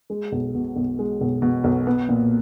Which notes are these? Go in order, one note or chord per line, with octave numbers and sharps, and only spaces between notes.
G#3
B1
B2
B1
G#3
B1
B2
B1
B3
A#2